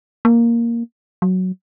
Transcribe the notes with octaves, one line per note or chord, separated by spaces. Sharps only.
A#3
F#3